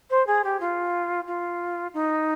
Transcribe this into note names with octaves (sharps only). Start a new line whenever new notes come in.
C5
G#4
G4
F4
F4
D#4